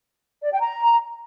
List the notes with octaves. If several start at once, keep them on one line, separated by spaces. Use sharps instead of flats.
D5
G5
A#5